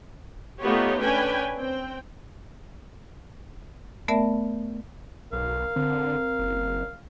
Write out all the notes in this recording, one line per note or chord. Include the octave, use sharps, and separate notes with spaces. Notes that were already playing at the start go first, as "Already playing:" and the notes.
A3 B3 D#4 F4 G4 C#5
C#4 D4 B4 G5 G#5
C4 G5
A3 B3 A#4 D5 E5 A5
B1 A#4 F5
D3 C4
F#1